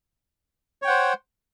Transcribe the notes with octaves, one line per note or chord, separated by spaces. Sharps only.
C5 C#5 F#5 G5